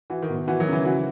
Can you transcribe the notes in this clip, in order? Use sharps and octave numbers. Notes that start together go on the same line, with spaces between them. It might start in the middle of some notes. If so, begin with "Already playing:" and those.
E3 F#4
D#3
B2
D#3
E3 F#4
D#3 F#3
C#3
E3
E3 F#4